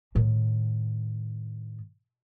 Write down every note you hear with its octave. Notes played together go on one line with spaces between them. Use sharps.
A2 D#3